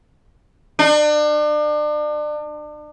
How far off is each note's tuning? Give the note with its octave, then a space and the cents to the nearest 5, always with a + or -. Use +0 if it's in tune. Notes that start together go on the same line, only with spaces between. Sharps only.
D4 +35